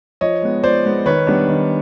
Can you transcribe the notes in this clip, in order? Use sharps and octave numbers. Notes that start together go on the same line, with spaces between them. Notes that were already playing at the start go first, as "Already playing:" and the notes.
F3 C#5 D#5
G#3 B3
F3 C5 D5
G#3 B3
D#3 B4 C#5
G3 B3 D4
D#3